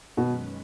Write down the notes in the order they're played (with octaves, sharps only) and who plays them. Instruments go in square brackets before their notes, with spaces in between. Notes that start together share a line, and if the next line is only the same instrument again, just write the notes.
[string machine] F#2 D#3 G#3 C#4 B4 [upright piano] B2